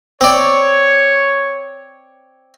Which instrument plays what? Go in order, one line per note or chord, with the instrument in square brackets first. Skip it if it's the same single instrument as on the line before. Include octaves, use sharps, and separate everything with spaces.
[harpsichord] C4 D5 [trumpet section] C#5